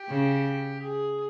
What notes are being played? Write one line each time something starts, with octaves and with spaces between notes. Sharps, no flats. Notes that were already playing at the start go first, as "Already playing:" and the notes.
Already playing: G4
C#3
G#4